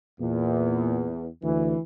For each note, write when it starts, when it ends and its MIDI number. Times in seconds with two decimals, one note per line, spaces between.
0.20 1.28 40
0.20 1.09 46
1.43 1.75 38
1.43 1.81 52